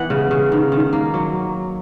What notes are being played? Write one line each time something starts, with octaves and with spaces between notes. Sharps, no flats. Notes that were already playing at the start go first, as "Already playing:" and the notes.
Already playing: E3 B3 F#5
C#3
C#3
D#3
D#3
A#3
F#3